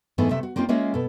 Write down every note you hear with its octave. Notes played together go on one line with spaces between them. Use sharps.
G#2 E3 A3 B3 E4
C3 A3 E5
F#4
A#3 C4 C#4 D#4 F4
G#3 A#3 C#4 F4 C#5 E5
B2 A4